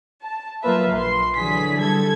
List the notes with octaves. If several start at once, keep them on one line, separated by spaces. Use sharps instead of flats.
A5
F#3 A#3 F4 B4 E5
A#1 C6
D3 E3 F#3 G#4 B6
G3 A4 G#6